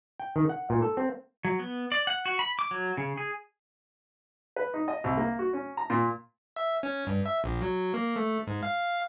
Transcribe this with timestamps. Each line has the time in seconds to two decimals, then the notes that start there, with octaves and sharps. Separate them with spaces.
0.20 G5
0.36 D#3
0.49 F#5
0.70 A#2
0.82 A4
0.97 C4
1.45 F#3
1.59 B3
1.92 D5
2.07 F#5
2.26 F#4
2.39 B5
2.59 D6
2.71 F#3
2.97 C#3
3.18 G#4
4.56 B4
4.74 D#4
4.88 D#5
5.04 C2
5.17 A#3
5.39 F#4
5.53 C#4
5.77 A#5
5.90 A#2
6.56 E5
6.83 C#4
7.07 G2
7.26 E5
7.44 A#1
7.62 F#3
7.94 A#3
8.16 A3
8.47 G#2
8.63 F5